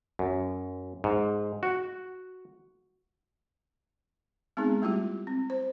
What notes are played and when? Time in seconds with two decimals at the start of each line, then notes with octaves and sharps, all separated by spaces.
0.19 F#2
1.04 G#2
1.63 F#4
4.57 G#3 B3 C4 D#4 G#4
4.82 G3 A3 E4 F4 G4
5.27 C4
5.50 C5